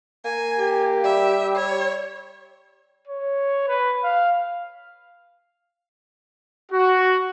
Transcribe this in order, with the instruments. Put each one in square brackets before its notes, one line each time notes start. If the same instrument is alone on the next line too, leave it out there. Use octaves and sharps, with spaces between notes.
[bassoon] A#3 [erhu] G#5
[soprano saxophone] G4
[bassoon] G3 [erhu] E5
[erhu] C#5
[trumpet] C#5
B4
F5
[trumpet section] F#4